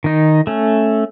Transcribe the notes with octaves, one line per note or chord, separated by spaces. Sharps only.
D#3 D#4
A3 C#4